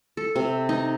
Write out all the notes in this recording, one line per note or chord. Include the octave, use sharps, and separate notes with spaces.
A4
C3
D#4